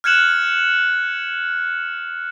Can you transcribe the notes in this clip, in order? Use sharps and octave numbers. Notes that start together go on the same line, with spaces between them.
F6 F#6 G#6 C#7 E7 F#7